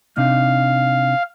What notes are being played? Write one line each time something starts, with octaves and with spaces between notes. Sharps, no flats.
C3 D4 D#4 F5